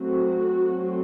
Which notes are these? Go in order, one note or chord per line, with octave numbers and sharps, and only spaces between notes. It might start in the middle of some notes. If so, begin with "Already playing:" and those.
Already playing: F#3 A3 C4 F#4
F#3 A3 C4